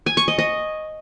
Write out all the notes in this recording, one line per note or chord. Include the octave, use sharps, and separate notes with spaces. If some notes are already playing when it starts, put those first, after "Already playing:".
G#5
C#6
D#5
D#5